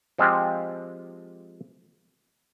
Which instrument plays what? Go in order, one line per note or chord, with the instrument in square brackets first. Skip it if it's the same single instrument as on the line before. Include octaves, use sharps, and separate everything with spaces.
[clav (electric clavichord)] F3 G#3 C4 F4 G4